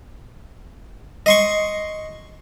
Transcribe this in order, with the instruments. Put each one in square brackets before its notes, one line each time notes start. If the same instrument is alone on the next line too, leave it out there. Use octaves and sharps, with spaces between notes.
[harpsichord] D#5 C6 C#6